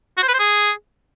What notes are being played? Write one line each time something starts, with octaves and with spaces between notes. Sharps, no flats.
F#4
C5
B4
C5
G#4